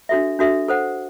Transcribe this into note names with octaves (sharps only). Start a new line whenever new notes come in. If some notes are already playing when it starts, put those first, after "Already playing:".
D4 F#4 A4 E5
D4 F#4 A4 E5
A4 C5 F#5